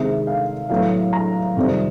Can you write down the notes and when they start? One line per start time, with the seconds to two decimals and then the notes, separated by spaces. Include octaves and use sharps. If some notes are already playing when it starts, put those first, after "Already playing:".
Already playing: C3 D#3 G#3 C4 E5
0.27 F5
0.69 A2 F#3 B3 F5
1.13 A#5
1.56 F2 C3 D#3 G3 C4